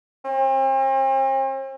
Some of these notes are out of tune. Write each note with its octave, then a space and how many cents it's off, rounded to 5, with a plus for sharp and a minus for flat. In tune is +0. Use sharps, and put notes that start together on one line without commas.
C4 +45